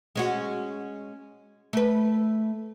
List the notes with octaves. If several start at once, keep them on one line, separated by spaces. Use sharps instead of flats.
G#3 C#4 F#4
A3 B4